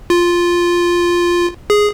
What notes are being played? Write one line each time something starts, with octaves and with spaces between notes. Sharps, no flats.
F4
G#4